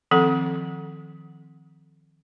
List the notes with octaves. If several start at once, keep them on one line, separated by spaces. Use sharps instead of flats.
D#3 F3 C4 A4 F#5